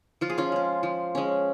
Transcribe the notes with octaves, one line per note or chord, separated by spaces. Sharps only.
F3 F4
G#4
C#4 F4
G#3 C#4
F3
G#3 C#4